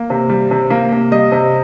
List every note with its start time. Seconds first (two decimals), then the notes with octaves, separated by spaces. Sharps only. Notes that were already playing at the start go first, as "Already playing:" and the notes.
Already playing: A#3
0.10 C3
0.30 G3
0.51 C3
0.70 A#3
0.92 C3
1.11 G3 D#5
1.32 C3